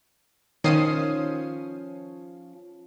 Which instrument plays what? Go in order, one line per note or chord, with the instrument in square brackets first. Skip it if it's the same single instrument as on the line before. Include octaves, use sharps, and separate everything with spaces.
[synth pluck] D#3 D#6 C7 [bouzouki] F3 B3 C#4